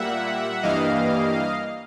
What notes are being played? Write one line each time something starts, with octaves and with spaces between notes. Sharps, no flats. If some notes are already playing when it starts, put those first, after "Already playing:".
Already playing: A#2 G3 A#3 E5 F#5
G2 E3 G3 A#3 D#5 F5